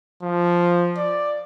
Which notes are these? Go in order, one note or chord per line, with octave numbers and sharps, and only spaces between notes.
F3
D5